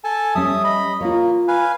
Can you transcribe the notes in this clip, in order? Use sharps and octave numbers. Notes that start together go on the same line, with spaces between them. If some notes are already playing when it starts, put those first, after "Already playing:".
A4 G#5 A5
G3 C#4 E5 D#6
D#5 B5
A#3 F4 C#5
B4 F5 G#5